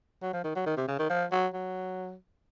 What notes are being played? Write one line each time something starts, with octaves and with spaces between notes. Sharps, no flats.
F#3
F3
D#3
F#3
D#3
C3
C#3
D#3
F3
F#3
F#3